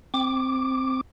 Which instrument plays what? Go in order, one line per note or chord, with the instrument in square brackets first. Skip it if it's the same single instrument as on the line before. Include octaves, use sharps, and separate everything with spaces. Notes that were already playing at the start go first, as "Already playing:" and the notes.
[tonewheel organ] C4 D6